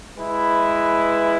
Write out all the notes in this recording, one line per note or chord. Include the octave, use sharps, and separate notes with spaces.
G#3 E4 B4